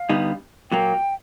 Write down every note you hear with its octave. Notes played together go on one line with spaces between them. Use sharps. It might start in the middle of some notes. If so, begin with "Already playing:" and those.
Already playing: F5
G2 D3 G3 B3 D#4
A#2 F#3 A#3 G5